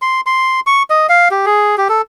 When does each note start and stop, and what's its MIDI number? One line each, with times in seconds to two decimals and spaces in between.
0.02 0.21 84
0.26 0.60 84
0.67 0.83 85
0.90 1.07 75
1.09 1.28 77
1.31 1.46 67
1.46 1.76 68
1.78 1.88 67
1.89 2.02 69